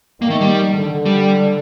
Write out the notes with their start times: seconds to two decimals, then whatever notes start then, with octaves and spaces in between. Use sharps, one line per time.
0.22 D#3 A#3
0.30 A3
0.41 G3
0.78 D3
1.06 G3